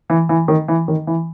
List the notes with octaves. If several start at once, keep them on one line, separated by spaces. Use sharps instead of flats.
E3
E3
D#3
E3
D#3
E3